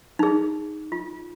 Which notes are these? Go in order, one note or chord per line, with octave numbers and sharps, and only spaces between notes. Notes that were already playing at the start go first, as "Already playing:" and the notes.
D#4 G#4
F4